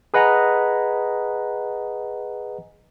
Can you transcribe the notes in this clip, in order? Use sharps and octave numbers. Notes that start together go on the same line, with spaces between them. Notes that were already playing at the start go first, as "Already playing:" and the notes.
G#4 B4 D#5 F#5 G#5 A#5